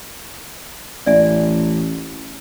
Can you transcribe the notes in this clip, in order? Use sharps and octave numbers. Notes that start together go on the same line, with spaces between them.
A1 D5 E5 G#5